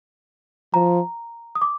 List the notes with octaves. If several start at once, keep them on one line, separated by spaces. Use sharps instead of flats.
F3 A#5
D#6
D6